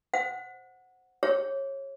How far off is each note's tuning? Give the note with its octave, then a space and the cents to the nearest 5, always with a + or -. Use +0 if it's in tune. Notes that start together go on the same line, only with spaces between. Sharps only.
C5 +0 F#5 +0
G#4 -35 C#5 -20